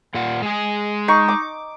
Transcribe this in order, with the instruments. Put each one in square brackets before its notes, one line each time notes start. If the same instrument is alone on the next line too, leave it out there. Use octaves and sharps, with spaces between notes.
[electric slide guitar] A#2 F4 F#5
G#3 G#4
[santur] D#4 C#6
D6